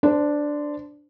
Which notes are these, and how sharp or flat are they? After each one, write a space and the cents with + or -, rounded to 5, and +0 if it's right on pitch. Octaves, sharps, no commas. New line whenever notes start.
D4 +0 C5 -20